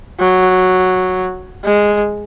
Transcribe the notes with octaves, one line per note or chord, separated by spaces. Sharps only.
F#3
G#3